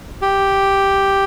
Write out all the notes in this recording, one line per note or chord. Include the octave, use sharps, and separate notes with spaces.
G4